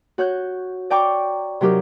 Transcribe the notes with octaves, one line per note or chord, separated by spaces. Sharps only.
F#4 C#5 F#6 G6
D5 G5 A#5 C#6 D6
C3 F#3 D#4 G4 A#4